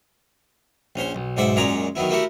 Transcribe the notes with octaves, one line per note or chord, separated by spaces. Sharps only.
A#1 C#4 C5 C6
B1
B1 G#2 C5 D5 E5 F#5
F#2 A#2 G#3 C#5 D5 A#5
D#3 F#3 B3 E4
A3 A#3 E4 F#4 G4 F#5